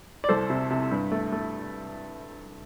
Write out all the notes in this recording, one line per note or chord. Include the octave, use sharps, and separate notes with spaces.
D5
C2 A4 C5
C3
C3
G2
A3
A3